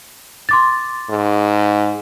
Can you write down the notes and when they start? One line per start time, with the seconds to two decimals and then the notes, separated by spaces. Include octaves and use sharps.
0.49 C6 D6 A6
1.10 G#2